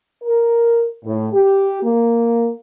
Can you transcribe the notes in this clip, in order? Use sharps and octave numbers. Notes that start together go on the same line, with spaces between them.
A#4
A2
G4
A#3